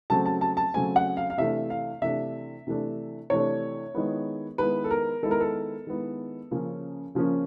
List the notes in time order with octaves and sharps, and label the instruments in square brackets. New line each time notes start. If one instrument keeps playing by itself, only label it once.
[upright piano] C#3 F#3 A3 C4 A5
A5
A5
A5
C#3 F#3 A3 C4 G#5
F#5
F5
F5
C3 E3 A3 D4 E5
F5
C3 E3 A3 D4 E5
C3 E3 A3 D4
C3 E3 A3 D4 C#5
D#3 G#3 B3 E4
D#3 G#3 B3 E4 B4
A4
A#4
D#3 G#3 B3 E4 A4
A#4
A4
D#3 G#3 B3 E4
C#3 F3 A#3 C#4
C#3 F3 A#3 C#4